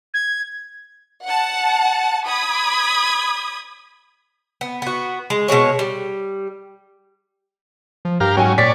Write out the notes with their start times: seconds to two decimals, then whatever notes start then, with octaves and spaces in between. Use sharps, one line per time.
0.14 G#6
1.23 F#5 A5
2.26 B5 D#6 G#6
4.61 B3
4.82 B3 F#4
5.30 G#3
5.48 B2 F#3 G#3 C#5
5.79 G3
8.05 F3
8.20 G2 G4 A#4 F5
8.37 G#2 F#3 C#4 G5 G#5
8.58 A#2 C#5 D5 A6 B6